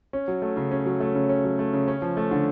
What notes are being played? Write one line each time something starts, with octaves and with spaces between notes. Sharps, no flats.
C#4
F#3
A3
C#3
C#4
F#3
A3
C#3
C#4
F#3
A3
C#3
C#4
F3
A3
D3